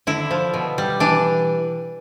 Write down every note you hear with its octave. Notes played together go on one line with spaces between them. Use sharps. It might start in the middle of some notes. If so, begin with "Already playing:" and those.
D3 E4
F3
B2
G3
E3 D4